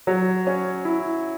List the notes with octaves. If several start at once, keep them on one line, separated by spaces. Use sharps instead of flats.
F#3
C#4
E4